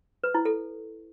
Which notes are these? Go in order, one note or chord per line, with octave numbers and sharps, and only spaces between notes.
B4
E4
A4